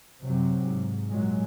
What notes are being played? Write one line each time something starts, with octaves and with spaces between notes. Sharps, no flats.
F#2 C3 F#3
G#2
A#2 F#3 G#3